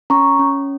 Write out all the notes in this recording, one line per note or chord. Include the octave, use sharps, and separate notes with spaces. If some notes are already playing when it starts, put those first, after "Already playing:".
C#4 A#5 C#6
C#4